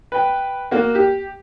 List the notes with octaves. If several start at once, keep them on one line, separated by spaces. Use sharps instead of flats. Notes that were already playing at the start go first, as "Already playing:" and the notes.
B4 G5
A#3 F#4
G4